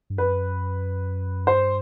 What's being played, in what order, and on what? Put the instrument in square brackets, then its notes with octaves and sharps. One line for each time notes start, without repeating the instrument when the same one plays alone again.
[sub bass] G2
[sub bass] F#2 [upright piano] B4
[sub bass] G2 [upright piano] C5